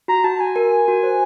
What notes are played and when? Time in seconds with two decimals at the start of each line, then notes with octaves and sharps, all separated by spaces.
0.08 F#4 A#5
0.24 F#4 A5
0.40 F#4 G#5
0.56 A#4
0.72 A#4
0.88 F#4
1.03 C5